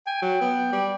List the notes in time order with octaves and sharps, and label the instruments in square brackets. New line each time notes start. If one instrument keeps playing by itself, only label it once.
[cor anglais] G5 [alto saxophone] G#5
[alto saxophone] F#3
B3
G3